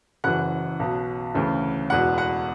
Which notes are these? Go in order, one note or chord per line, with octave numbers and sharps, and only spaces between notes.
F#1 F#2 E3 F#5 F#6
B1 B2
D2 C#3 E3
E1 E2 B2 F#5 F#6
F#5 F#6